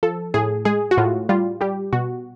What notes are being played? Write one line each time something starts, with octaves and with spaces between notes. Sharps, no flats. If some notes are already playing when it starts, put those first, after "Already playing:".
F3 A4
A2 G#4
G#3 G#4
F#4
A2 F4
G3 F4
G3 G4
B2 F#4